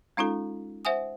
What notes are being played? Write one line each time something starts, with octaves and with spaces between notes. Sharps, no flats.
G#3 C#4 D#4 F4 A4
C5 E5 F#5 G#5 D#6